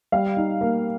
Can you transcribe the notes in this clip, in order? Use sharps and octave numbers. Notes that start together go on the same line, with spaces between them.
G3 F5
D#4
A#3